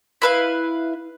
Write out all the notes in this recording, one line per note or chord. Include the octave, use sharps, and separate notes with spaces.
E4 B4 F5